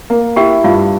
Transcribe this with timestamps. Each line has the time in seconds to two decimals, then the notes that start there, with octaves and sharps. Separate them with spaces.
0.10 A#3
0.36 E4 G4 G5
0.64 G2 F4 F5